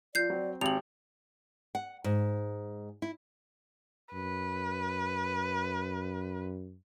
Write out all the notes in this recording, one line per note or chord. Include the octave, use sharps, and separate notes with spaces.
F3 F4 D5 G6 C7
F#3 C4
G#1 C4 G4 F7 F#7
F#5
G#2
E4
F#2 B4